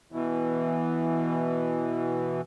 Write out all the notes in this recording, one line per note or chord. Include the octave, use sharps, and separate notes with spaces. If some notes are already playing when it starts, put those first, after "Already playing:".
B2 E3